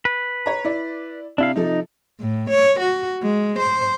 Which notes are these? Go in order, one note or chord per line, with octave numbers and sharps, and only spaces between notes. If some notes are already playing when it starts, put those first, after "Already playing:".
B4
C#5 A#5
E4 D5
C3 D4 E4 F5
C3 F3 D#4 A4
A2
C#5
F#4
G#3
C5